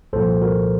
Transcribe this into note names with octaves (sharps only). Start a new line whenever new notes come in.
C2 A#2 F3 A4 C5
F#4 A#4